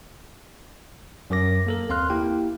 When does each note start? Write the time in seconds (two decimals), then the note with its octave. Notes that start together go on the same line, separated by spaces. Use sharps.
1.30 F#2 F#3 A#4 D6 A#6
1.67 A#3 A4 A#4
1.89 D#2 C4 F5 C6 F6 F#6
2.10 A#3 E4 G4 G5